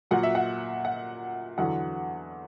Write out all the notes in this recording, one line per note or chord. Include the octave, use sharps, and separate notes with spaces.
A#2 F#3 F#5
E5
F#5
F#5
E2 D3 F#3 F#5